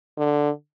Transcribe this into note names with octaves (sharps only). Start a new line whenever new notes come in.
D3